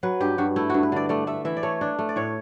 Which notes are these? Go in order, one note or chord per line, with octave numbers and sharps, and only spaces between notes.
F#3 B4
G2 G4
G2 F#4
A3 E4
G2 F#4
B4
D3 D5
A3 D5
A3 E5
E3 E5
D5
A3 C#5
D4
A3
D5
A2 C#5